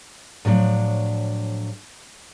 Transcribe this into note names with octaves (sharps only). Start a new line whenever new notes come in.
A2 F3 F#3 D4